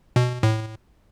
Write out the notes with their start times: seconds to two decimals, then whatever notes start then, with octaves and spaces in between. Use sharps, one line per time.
0.16 B2
0.43 A2